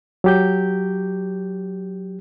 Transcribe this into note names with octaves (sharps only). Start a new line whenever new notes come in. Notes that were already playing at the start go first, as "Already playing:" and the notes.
F#3 G4 G6